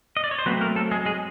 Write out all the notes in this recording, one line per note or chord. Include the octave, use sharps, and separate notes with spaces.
D#5
D5
C#5
C5
F#3 A3 B3 C4 B4
A#3 A#4
A3 A4
G#3 G#4
G#3 G#4